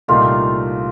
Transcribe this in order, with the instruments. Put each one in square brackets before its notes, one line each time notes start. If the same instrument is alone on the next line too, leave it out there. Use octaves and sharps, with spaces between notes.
[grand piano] C2 A#2 A3 D#4 G4 [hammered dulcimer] F4